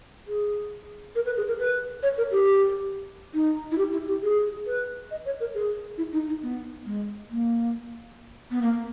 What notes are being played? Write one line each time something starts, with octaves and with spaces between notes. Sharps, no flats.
G#4
A#4
B4
G#4
A#4
B4
C#5
A#4
G4
D#4
E4
G4
E4
G4
G#4
B4
D#5
C#5
A#4
G#4
E4
D#4
D#4
B3
G#3
A#3
B3
A#3